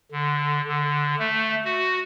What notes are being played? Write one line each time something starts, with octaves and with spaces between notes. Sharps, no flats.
D3
D3
A3
F#4